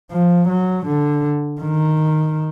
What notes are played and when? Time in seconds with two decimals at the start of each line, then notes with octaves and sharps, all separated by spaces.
0.11 F3
0.49 F#3
0.86 D3
1.61 D#3